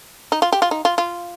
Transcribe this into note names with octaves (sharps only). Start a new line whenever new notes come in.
D#4
F4
G4
F4
D#4
F4
F4